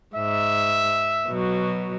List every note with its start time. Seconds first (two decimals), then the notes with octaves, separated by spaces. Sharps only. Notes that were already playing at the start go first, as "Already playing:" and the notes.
0.15 G#2 E5
1.28 B2 F#3